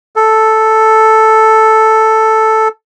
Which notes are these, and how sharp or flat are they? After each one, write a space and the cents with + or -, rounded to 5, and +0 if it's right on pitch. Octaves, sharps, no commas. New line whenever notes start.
A4 +0